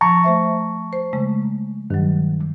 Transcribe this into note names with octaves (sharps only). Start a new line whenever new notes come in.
F3 A5 A#5 C#6
A3 C5 E5
C5
C#3 G#3 A3
G2 D#3 F#3